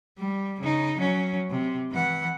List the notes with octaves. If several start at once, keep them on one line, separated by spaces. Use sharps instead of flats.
G3
C#3 D#4
F#3 C#4
C3
E3 F#5